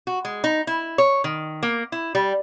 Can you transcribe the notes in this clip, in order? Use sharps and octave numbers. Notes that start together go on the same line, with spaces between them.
F#4
G#3
D#4
E4
C#5
D#3
A#3
E4
G3